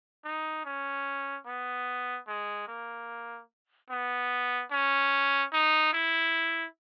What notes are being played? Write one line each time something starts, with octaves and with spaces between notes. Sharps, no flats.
D#4
C#4
B3
G#3
A#3
B3
C#4
D#4
E4